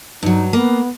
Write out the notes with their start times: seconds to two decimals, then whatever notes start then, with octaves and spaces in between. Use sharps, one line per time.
0.23 G2 F#3 D#4
0.53 A#3 B3